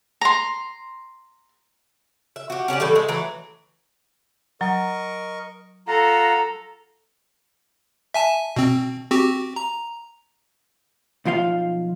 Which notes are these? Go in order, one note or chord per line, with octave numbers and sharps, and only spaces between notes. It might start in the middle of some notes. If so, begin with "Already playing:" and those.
A#5 C6
E5
F#4 G4
C#4 G4 A4 D5
A2 E3 G3 A4
G#3 A3
E3 F#3 A3 A#5
F#3 A#4 D#5 A#5 C#6
F4 A4 F5 F#5 A#5
E5 G#5 A5
B2 C4
C4 F#4 G4
A#5
B1 F3 F4 F5